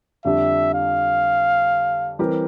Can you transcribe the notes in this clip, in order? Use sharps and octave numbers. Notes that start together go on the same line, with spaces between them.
F2 D3 G3 D4 G4 E5
F5
E3 G3 C4 G4 A#4